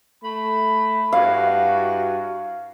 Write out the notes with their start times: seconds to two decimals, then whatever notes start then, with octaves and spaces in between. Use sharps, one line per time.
0.24 A3 B5
1.13 G2 E4 F#4 F5